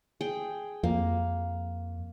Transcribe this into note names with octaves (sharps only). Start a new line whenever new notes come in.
G#4 G5
F2 A#3